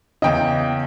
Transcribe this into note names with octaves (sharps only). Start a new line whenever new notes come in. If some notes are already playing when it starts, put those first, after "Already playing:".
E2 C#3 D#5 G5